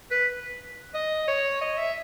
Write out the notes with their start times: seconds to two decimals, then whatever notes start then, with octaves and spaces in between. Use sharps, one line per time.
0.11 B4
0.94 D#5
1.28 C#5
1.61 D#5
1.78 E5